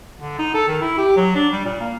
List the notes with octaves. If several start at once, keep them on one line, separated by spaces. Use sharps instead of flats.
D3
D#4
A4
D#3
E4
G4
F#3
D4
G3
A#2
A#3